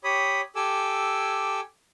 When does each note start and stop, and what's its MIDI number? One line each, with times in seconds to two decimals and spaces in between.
0.04 0.41 67
0.04 0.41 73
0.04 0.41 83
0.04 0.41 87
0.56 1.60 67
0.56 1.60 69
0.56 1.60 80
0.56 1.60 86
0.56 1.60 88